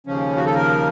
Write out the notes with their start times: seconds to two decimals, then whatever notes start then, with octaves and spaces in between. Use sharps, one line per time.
0.06 D#2 C#3 F3 C#4
0.36 F#4
0.46 A4
0.55 A#4